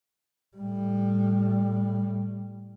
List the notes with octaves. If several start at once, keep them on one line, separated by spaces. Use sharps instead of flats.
A2 G3